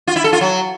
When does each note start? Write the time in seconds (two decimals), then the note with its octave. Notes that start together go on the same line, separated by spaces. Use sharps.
0.07 F4
0.16 E4
0.24 A4
0.33 F4
0.41 F#3